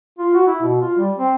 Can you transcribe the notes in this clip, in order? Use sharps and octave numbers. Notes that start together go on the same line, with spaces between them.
F4
F#4
E4
B2
F4
G3
C4